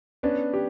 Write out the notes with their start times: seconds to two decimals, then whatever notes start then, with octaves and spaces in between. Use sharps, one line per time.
0.23 B3 C#4 D4
0.54 G4